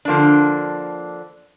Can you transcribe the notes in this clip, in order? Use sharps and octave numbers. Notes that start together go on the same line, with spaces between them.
D3 F3 A#3 D4